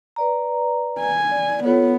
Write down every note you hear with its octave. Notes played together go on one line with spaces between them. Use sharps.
B4 D5 A#5
G#5
D5
B3 F4 A4 C#5